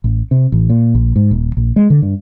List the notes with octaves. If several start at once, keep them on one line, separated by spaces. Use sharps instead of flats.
A1
C3
A1
A#2
A#1
G#2
D#1
A#1
G#3
D3
G2